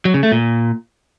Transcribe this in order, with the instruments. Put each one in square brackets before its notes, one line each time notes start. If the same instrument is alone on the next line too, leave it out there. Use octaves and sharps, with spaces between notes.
[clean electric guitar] F#3
C#3
A3
A#2